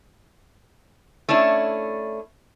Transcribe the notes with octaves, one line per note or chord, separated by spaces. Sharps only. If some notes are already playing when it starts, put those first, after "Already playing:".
A3 C#4 D4 E4